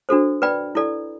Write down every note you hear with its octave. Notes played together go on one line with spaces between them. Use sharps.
D4 F#4 A4 C5
B4 D5 G5 B5
E4 A4 D5